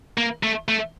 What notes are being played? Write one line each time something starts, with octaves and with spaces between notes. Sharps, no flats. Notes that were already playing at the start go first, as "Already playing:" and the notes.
A#3
A3
A3